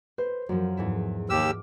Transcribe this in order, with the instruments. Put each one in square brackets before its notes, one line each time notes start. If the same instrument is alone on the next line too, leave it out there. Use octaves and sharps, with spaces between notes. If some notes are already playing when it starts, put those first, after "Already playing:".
[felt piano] B4 [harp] C5
[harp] F#2 F3 [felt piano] F#3
[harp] E2 G#2 E4
[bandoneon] D#2 G4 E6 [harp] D6 F6